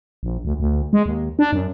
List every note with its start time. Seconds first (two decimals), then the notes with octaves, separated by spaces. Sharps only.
0.23 A#1
0.45 D2
0.60 D2
0.93 G#3
1.06 D#2
1.39 D4
1.53 F#2